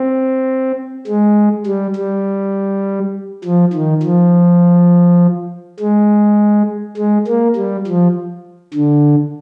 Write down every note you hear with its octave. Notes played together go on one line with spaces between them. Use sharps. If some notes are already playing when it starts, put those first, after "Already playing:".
Already playing: C4
G#3
G3
G3
F3
D#3
F3
G#3
G#3
A#3
G3
F3
D3